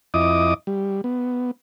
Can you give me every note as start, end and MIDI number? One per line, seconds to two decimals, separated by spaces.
0.14 0.54 41
0.14 0.54 64
0.14 0.54 75
0.14 0.54 86
0.14 0.54 87
0.67 1.01 55
1.04 1.51 59